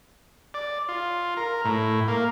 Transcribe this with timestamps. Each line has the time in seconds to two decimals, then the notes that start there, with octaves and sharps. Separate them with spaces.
0.54 D5
0.89 F4
1.37 A#4
1.65 A2
2.08 A#3